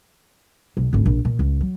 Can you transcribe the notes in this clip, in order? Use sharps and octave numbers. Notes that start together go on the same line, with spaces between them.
B1
G#1 D2
A#1
A#2
C#2
F#3